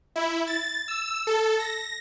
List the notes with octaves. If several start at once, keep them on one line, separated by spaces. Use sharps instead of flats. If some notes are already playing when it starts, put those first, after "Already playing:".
E4
A6
E6
A4
A#6